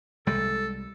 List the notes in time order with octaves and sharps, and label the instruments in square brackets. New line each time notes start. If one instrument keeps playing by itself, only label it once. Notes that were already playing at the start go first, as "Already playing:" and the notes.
[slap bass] C2 G3 G#3 [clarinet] A4